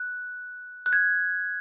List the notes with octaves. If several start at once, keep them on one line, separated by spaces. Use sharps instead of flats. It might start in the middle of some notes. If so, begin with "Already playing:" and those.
Already playing: F#6
F#6
G#6